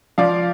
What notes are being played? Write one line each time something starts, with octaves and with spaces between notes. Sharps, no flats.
F3 D5 F5